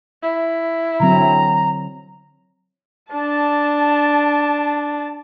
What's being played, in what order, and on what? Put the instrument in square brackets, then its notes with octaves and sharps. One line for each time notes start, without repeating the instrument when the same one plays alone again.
[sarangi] E4
[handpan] D3 F#3 C4 [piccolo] A#5
[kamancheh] D4 A5